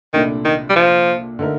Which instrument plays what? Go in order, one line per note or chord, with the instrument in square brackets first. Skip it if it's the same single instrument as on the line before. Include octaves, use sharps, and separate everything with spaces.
[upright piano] C2 A#2 A3 D4 [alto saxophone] D#3
[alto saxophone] D#3
G3
F3
[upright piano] D3 A3 D#4 A#4